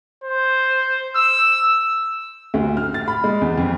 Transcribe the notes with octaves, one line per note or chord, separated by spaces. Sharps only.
C5
E6
D2
F6
A6
B5
G#3
E2
F2